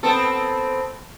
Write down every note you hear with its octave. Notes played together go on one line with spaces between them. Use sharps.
B3 C4 A4